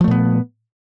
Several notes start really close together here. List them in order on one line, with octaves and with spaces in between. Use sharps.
F3 A3 A#2 B3